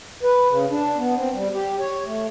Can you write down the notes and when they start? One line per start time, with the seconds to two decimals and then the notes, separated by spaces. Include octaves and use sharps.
0.23 B4
0.49 C#3
0.70 D4
0.97 B3
1.15 C4
1.34 G3
1.54 G4
1.80 C#5
2.05 A3